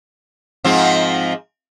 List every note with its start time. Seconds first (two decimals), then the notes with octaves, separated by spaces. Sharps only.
0.64 G#2 F3 C4